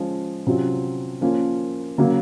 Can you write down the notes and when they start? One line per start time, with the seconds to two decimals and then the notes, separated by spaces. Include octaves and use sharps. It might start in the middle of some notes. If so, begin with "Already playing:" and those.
Already playing: F3 G#3 C#4
0.47 C3 F#3 C#4 F4
1.21 F3 A#3 C#4 F4
1.98 C#3 F#3 A#3